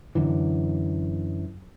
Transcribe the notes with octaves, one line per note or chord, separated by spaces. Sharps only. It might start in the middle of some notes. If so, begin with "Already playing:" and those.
F#2 D3 E3